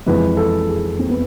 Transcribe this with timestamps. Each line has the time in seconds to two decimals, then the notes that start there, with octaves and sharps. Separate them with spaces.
0.06 F2 E3 G#3 B4
0.37 A4
0.69 G#4
0.99 C4
1.09 B3